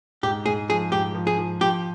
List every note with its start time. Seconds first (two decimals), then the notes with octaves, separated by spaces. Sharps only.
0.23 G#2 G4
0.46 G#2 G#4
0.69 F3 G#4
0.92 G#2 G4
1.15 F3
1.27 G#4
1.38 F3
1.61 F3 G4